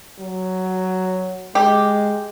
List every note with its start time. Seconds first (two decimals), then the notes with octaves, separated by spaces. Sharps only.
0.20 F#3
1.55 G#3 G4